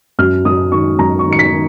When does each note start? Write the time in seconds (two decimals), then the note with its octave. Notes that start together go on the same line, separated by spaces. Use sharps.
0.19 F#2 F6
0.45 F#2 D#6
0.72 D#3 C#6
0.99 F#2 A#5
1.19 C#6
1.26 D#3
1.32 C#7
1.39 B6
1.52 D#3